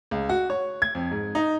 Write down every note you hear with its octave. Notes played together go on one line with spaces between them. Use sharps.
C#2
F#4
C#5
G#6
F2
G#2
D#4